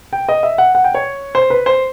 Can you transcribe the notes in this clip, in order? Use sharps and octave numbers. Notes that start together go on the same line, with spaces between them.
G5
D#5
E5
F#5
F#5
G5
C#5
C5
B4
C5